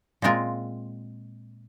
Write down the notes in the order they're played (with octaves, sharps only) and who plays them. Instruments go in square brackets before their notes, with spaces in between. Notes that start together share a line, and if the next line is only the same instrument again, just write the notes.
[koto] A#2 G#3 C4 F4 A#4